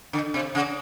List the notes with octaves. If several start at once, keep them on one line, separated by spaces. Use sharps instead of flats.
D3
C3
C#3